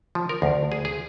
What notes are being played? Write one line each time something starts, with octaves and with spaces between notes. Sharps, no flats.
F3
A#4
D2
G#4
G#4